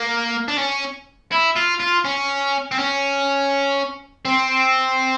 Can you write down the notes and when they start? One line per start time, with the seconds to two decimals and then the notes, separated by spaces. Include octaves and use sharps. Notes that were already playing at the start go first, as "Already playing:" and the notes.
Already playing: A#3
0.48 D4
0.58 C#4
1.32 E4
1.56 F4
1.80 F4
2.05 C#4
2.72 C4
2.79 C#4
4.25 C4